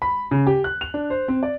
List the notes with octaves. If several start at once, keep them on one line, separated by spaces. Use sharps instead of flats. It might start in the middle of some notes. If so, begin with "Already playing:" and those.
B5
C#3
G4
F#6
F7
D4
C5
C4
D5